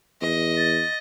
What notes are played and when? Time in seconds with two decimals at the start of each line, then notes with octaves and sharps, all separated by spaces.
0.21 E2 D#5
0.57 A6